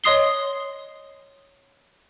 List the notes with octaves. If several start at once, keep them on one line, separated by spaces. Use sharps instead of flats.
C#5 D#5 C6 D#6 C7 G7